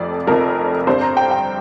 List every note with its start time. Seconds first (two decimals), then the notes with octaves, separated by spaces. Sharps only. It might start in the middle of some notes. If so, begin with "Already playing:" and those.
Already playing: F1 F2 F3 D5
0.27 F1 F2 F3 A#4
0.87 G2 G3 C4 C5
1.01 A#5
1.17 G5
1.31 G5